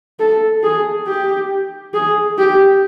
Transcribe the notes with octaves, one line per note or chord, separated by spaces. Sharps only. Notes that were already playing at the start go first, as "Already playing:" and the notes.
A4
G#4
G4
G#4
G4